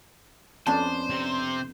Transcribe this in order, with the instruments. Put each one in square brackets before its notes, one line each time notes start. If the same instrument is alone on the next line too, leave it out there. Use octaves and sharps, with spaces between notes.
[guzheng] F2 B3 D4 [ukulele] C#4 D5 A5 [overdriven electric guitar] C5
[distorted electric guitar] C3